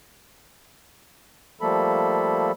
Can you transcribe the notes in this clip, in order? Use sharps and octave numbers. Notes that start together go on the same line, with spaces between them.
F3 G3 A3 A#3 A4 B5